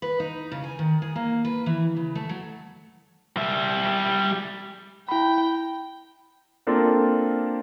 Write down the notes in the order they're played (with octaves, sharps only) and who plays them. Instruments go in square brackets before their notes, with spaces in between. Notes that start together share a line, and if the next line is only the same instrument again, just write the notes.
[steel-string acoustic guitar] B4
D#4
C#3
G#5
D#3
G#4
A#3
B4
E3
C#3
A3
F#3
[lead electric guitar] G3 E5
[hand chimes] E4 B5 [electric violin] G5
[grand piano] A#3 C4 D4 F4 A4 A#4